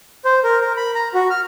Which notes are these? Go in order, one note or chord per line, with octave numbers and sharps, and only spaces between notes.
C5
A#4
A#4
B5
A#5
F#4
F6